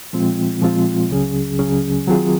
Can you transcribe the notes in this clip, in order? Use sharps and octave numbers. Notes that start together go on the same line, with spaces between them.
A#2 F3 G#3 C4 F4
A#2 F3 G#3 C4 F4
C#2 C#3 F#3 C#4 G#4
C#2 C#3 F#3 C#4 G#4
D#3 F#3 C4 F4 G#4